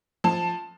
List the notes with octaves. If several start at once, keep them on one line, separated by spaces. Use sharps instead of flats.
F3 A5